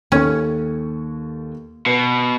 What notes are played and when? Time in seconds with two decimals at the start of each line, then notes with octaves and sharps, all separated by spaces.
0.12 D#2 C#4 A4 C#6
1.86 B2 B4